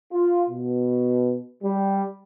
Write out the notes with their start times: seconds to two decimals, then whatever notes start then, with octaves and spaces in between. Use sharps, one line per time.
0.11 F4
0.49 B2
1.63 G3